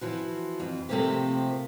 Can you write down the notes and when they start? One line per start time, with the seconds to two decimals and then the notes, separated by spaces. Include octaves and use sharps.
0.01 E3 F3 F#4
0.60 F2
0.89 C3 F3 A3 A#3 C4 G4